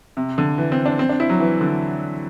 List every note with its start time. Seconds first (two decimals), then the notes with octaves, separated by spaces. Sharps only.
0.17 C3
0.38 D3
0.58 E3
0.72 C4
0.86 D4
0.99 C4
1.09 D4
1.20 E4
1.30 F#3
1.40 E3
1.61 D3